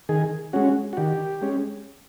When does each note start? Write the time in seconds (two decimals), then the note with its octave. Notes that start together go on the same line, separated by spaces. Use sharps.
0.09 D#3 G#4
0.53 G#3 C#4 F#4
0.93 F#4
0.97 D#3 G4
1.42 G#3 C#4